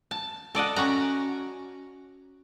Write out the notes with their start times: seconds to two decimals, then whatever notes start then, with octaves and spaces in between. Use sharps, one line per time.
0.11 A5
0.55 A4 D5 D#5 F#5
0.76 C#4 F#4 F#5 A#5